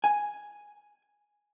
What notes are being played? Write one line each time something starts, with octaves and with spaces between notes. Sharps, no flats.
G#5